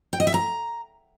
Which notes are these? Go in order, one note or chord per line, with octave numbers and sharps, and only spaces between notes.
G5
D#5
E5
A#5